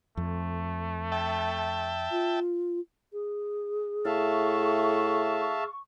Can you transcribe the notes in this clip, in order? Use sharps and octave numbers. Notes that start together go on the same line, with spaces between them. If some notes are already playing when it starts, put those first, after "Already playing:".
F2 A3
E5 G5 A5
F4
G#4
A2 E5 F5 A5 C#6